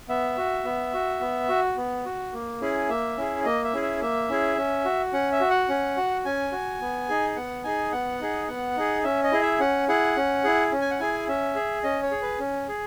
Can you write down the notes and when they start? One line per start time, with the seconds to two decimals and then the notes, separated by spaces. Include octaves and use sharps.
0.09 B3 E5
0.37 F#4
0.65 B3
0.94 F#4
1.21 B3
1.49 F#4
1.77 B3
2.06 F#4
2.33 A#3
2.61 C#4 E4 G#4
2.89 A#3 E5
3.17 C#4 E4 G#4
3.45 A#3 D#5
3.64 E5
3.74 C#4 E4 G#4
3.82 E5
4.01 A#3 E5
4.29 C#4 E4 G#4
4.57 C#4
4.85 F#4
5.13 C#4 F#5
5.32 E5
5.40 F#4
5.50 F#5
5.69 C#4
5.97 F#4
6.25 C#4 G#5
6.52 F#4
6.81 B3
7.09 D#4 G#4
7.36 B3 F#5
7.64 D#4 G#4 G#5
7.92 B3 F#5
8.21 D#4 G#4
8.48 B3 F#5
8.77 D#4 G#4
9.04 C#4 E5
9.24 D#5
9.32 E4 G#4
9.42 E5
9.60 C#4 F#5
9.88 E4 G#4 F#5
10.17 C#4
10.44 E4 G#4
10.72 C#4
10.81 G#5
10.91 F#5
10.99 E4 G#4 G#5
11.28 C#4 E5
11.55 G#4
11.83 C#4 D#5
12.03 C#5
12.11 G#4
12.22 B4
12.39 C#4
12.68 G#4